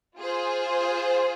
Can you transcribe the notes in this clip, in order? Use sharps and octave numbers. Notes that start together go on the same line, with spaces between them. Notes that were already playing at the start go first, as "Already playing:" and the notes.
F4 G#4 C5